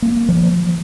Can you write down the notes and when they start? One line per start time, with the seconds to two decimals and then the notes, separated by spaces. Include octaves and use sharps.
0.02 A#3
0.29 F3